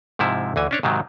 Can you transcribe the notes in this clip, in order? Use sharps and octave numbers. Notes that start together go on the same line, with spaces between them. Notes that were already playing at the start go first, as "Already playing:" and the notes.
G#2 C3 F3 E4
D2 E3 G#5
C#4 D4 C#5
G#2 C3 D#3 F#3